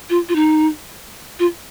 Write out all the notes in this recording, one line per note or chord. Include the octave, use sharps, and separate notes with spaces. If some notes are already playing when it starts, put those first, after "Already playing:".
F4
F4
D#4
F4